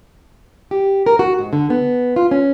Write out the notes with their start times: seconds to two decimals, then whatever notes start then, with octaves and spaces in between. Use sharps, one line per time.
0.71 G4
1.06 A#4
1.19 F#4
1.39 G#2
1.53 D3
1.70 B3
2.16 F4
2.31 C#4